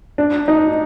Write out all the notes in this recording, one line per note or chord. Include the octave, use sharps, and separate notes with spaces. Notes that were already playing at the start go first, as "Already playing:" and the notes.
D4
D#4